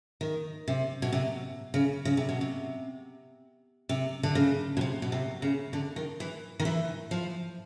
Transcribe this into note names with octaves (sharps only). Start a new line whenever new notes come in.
D#3
C3
B2
C3
C#3
C#3
C3
B2
C3
C3
D3
C#3
B2
C3
B2
C3
C#3
D3
D#3
E3
D#3
E3
F3